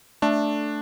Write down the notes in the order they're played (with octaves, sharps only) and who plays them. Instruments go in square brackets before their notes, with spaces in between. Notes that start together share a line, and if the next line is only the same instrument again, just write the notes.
[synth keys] A3 [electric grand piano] D4